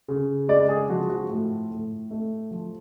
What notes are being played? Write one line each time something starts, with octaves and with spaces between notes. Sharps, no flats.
C#3
G#3 D5
G#4
F3 F#4
F#4
A2
A2
A3
F3